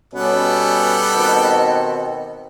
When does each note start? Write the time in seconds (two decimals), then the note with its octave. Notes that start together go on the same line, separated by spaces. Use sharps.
0.14 B2 G3 B3 C#4 A4
1.16 B2 D#3 C4